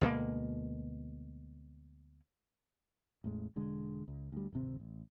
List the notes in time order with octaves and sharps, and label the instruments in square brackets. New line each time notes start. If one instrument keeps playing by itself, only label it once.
[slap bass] D2 B2 G#3 A#3
[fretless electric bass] A1 E2 A2 G#3
E1 D3 G#3
C#2
D2 G3
D1 G#1 C3 C4
A1